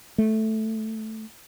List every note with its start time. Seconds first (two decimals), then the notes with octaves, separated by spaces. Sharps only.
0.18 A3